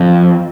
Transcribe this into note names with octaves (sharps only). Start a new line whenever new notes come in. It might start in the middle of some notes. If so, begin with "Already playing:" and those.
Already playing: F2